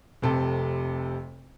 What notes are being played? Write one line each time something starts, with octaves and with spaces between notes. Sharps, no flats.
F1 C3 A4